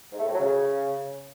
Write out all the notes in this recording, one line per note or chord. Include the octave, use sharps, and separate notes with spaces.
G#2
A3
A2
F#3
C#3